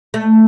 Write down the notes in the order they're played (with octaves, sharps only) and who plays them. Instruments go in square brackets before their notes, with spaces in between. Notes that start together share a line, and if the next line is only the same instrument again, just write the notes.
[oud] A3